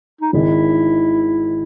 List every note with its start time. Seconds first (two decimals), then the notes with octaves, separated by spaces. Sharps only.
0.21 D#4
0.33 G#1 G#2 D#3 E4